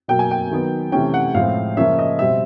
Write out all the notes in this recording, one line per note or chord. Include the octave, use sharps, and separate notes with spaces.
B2 F#3 A#3 G5
G#5
G5
D#3 F#3 B3
C3 E3 A3 C#4 G5
F#5
A2 F3 G#3 C4 F5
C#3 F3 A#3 C#4 E5
D#5
B2 G3 C4 E5